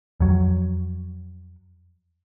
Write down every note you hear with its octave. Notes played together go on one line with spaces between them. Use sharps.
F2 F#3